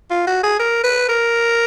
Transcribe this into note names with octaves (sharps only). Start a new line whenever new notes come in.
F4
F#4
G#4
A#4
B4
A#4